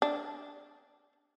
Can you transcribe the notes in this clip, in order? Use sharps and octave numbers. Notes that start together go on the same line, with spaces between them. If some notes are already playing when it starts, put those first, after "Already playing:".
D4